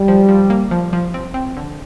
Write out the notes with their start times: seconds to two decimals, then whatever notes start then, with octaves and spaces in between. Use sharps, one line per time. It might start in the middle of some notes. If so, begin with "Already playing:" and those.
Already playing: G3
0.08 F3
0.29 F3
0.50 A#3
0.71 F3
0.93 F3
1.14 C4
1.34 C4
1.57 D3